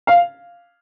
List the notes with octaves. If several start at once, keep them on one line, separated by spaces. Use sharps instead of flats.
F5